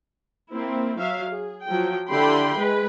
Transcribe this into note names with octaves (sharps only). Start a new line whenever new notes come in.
A#3 C4 E4
F#3 E5 F5
G#4
F3 F#3 G5
D3 E4 G4 G5 B5 C6
G#3 B4